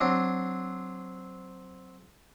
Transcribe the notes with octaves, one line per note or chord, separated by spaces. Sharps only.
F#3 C4 D4